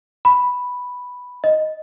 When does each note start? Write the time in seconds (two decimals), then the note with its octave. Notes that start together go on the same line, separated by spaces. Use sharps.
0.25 B5
1.44 D#5